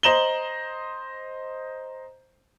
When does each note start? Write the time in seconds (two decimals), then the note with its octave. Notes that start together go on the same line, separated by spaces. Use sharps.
0.03 C5 D#5 A#5 E7 F#7 G7